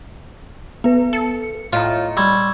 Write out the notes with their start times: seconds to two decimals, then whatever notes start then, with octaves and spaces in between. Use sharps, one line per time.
0.84 B3 B4
1.13 A4 C#7
1.73 A2 F4 C#5 D#5 A#5
2.17 G3 C6 C#6 E6 G#6